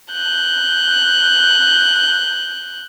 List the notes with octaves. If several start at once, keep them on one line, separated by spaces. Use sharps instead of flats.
F#6 G6